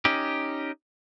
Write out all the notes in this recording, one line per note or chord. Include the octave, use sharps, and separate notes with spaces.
C#4 D#4 G4